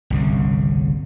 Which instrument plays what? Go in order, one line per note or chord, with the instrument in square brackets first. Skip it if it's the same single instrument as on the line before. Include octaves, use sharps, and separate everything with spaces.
[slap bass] G1 C2 C#3